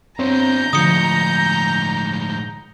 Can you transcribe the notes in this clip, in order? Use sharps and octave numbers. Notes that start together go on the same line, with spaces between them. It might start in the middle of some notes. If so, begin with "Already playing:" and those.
G2 D3 C4 C5 C#5 A#5 G6
A2 D3 F3 G#3 D#6 C#7